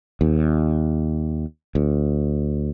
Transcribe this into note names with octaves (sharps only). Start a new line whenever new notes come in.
D#2
D2